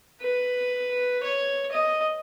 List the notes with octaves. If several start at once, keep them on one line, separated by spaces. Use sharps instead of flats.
B4
C#5
D#5